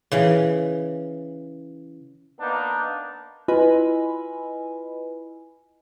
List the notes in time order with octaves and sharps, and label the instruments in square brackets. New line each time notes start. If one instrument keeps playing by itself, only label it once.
[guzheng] C#3 E3
[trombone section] A#3 B3 D4 D#4
[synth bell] E4 F4 B4 D#5 G#5 B5